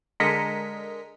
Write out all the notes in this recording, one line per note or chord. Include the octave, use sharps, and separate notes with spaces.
D3 G#3 A#4 D#5 B6 C#7